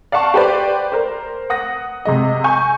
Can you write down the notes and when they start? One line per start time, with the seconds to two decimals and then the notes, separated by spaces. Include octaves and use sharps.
0.12 D5 F5 F#5 A5 C#6
0.34 G4 B4 C5 D5
0.92 A#4 C5
1.50 F#5 D#6 A#6
2.05 C3 G#3 D#5
2.44 G#5 C#6 G6